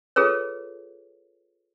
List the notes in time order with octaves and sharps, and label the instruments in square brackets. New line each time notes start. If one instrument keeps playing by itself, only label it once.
[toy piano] F4 G#4 A4 B4 C#5